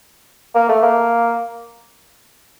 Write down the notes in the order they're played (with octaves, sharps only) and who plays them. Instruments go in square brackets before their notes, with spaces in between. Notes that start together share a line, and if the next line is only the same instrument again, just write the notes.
[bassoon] A#3
A3
A#3